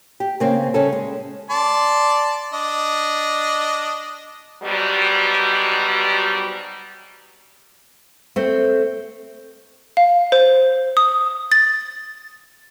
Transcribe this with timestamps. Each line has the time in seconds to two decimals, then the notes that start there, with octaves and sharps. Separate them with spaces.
0.20 G4
0.40 C#3 A#3 C4
0.74 C#3 G3 C#4 A4
0.93 G#3
1.50 D5 A5 C6
2.54 D4 D#5
4.63 G#2 B2 F#3 G3
8.36 A3 C4
9.97 F5
10.32 C5
10.97 D#6
11.52 A6